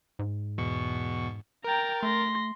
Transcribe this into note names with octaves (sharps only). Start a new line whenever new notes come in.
G#2
E2 B2 C#6
A#4 G5 A#5 A6
A3 C6 A#6